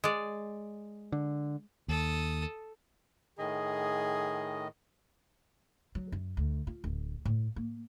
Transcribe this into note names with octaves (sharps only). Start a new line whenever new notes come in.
G#3 D5
D3
D#2 A4 D#6
A2 D#3 G#4 D#5
F#3
F#2
D2
F4
D1
A2
A#3